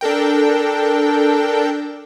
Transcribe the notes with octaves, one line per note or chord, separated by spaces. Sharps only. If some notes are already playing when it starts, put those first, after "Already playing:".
D4 A4 A#4 G5